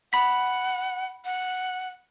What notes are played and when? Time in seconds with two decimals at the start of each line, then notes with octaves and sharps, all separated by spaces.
0.13 F#5 B5 B6
1.25 F#5